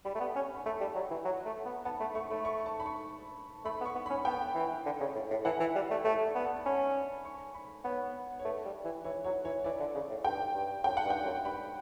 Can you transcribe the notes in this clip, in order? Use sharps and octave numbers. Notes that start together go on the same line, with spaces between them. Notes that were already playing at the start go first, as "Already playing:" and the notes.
G3 B5
A3
B3
C#4
B5
A3 A5
G3
F#3
E3
F#3
A3
B3
B3 A5
A3 B5
A3 C#6
A3 B5
C#6
A5
B5
C#6
A3 B5
B3
C#6
B3
C#4 B5
B3 G5
E3
D3
C#3
A2
A2
E3 F#5
E3
G3
A3
A3 E5
D5
B3
A5
A5
C#4 B5
C#6
B5
B3 C#5
C#5
A3 B4
G3
E3
E3 C#5
F#3 C#5
E3 C#5
E3 D5
D3
C#3
A2
G2 G5
G2
F#2 G5
F#5
G2
G5
F#2
G2 B5